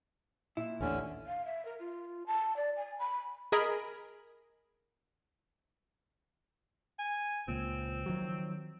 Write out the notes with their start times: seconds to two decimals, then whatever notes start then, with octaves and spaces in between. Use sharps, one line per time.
0.57 A#2 E4
0.81 A1 D#2 D3 C#4 D4
1.27 F5
1.45 E5
1.65 A#4
1.79 F4
2.27 A5
2.57 D5
2.76 G#5
2.99 B5
3.52 G#4 A#4 D#5 G#5 B5 D7
6.99 G#5
7.48 C#2 A#2 C4
8.06 D#3 F3 F#3